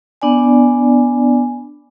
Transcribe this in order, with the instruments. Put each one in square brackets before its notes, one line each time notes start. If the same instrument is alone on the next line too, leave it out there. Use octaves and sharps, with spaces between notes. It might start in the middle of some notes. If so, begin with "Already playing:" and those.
[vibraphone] B3 D4 D5 G#5